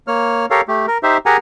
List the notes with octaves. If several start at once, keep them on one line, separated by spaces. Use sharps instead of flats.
A#3 C#5 F6
G4 A4 A#4 C#5 F5
A3 G4
A#4
D#4 G4 C5 E5
G4 G#4 A#4 F#5 G#5 A#5